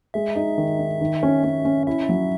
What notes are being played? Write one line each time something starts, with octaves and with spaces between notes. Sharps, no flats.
G#3 E5
D#4
D#3
D#4
D#3
C#4
C#4
C#4
E4 E5
F#3